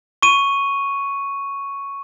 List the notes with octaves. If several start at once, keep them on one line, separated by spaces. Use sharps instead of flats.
C#6 D#7